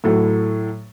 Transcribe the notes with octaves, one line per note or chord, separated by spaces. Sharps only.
A2 F#3 A4